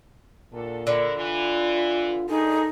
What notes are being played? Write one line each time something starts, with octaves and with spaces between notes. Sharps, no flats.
D#2 A#2 D3 A4
D3 E4 A#4
E3 F4
G2 A#2 D#4 G#4 A4